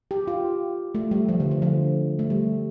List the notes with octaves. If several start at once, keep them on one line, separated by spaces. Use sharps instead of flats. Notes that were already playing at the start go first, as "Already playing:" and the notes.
G4
F4
A3
G3
F3
D3
D3
F3
A3
G3